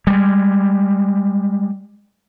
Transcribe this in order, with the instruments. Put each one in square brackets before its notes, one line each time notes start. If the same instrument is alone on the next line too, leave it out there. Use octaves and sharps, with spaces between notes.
[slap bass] G3 G#3